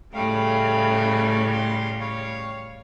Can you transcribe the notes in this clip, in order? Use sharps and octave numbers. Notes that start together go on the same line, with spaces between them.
A2 C#3 G3 A3 F5
F5 C6
C#5 F5